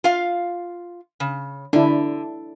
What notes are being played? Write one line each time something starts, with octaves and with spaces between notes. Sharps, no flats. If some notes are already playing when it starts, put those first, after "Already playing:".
F4 F5
C#3
D3 D4 E4